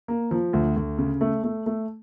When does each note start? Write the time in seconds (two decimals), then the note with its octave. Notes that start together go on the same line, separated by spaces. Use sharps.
0.08 A#3
0.31 F3
0.53 D2
0.76 D2
0.98 C#3
1.21 A3
1.44 A3
1.66 A3